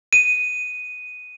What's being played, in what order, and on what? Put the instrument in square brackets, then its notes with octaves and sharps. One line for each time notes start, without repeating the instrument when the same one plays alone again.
[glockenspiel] D#7